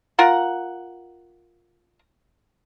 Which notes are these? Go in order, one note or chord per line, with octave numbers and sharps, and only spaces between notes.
F4 A#4 F#5